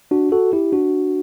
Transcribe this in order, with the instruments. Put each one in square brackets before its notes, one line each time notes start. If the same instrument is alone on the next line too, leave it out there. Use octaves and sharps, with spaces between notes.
[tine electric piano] D4 F#4
F#4 A4
E4 G4
D4 F#4